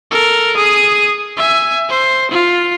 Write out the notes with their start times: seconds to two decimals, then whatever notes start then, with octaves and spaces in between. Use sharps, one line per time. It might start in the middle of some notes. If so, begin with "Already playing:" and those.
0.11 A4 A#4
0.56 G#4 D#6
1.37 E5 G#5
1.89 C5
2.31 F4